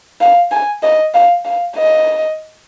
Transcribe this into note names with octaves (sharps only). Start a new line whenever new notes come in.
F5
G#5
D#5
F5
F5
D#5